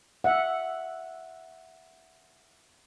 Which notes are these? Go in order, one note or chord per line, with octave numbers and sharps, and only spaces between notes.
E5 F#5